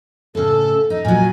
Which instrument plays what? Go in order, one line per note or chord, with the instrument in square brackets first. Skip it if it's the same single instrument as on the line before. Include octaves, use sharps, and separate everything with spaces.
[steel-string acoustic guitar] A2 C#3 [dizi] A4
[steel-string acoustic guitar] D#4
[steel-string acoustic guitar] A#2 F#3 [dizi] G#5